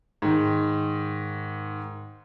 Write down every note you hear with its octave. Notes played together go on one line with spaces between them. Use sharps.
G#2 D#3